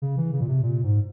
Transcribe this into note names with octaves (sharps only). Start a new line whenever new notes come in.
C#3
E3
C#3
A#2
C3
A#2
G#2